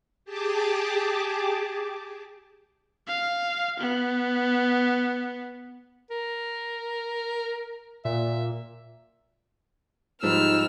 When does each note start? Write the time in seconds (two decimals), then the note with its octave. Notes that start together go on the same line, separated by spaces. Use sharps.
0.25 G4 G#4 A5 D6
3.08 F5
3.80 B3
6.11 A#4
8.05 A#2 E5
10.23 G#2 F3 G3 D#4 E6 F6